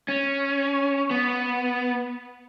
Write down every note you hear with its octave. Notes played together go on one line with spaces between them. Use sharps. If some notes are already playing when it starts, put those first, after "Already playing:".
C#4
B3